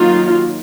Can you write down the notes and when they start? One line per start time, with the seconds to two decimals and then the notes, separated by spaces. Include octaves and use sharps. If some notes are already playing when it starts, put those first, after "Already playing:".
Already playing: D#3 F#3 A#3 D#4 F4